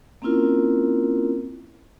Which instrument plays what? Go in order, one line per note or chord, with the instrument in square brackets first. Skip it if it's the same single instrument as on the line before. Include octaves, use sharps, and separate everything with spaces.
[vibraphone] A#3 C4 C#4 E4 F4 A#4